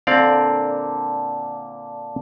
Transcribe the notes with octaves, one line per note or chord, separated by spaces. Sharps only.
A#2 D3 C4 D5 F5